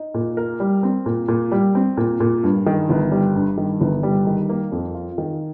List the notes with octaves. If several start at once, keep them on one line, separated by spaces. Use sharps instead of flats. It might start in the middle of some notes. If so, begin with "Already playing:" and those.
Already playing: D#4
A#2
A#4
G3
C4
A#2
A#2
G3
C4
A#2
A#2
G2
D#3
G1
G3
G2
D#3
G1
G3
D#3
A#3
F2
F4
D#3